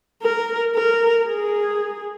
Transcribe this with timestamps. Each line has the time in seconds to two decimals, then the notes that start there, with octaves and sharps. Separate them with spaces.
0.22 A#4
0.75 A#4
1.27 G#4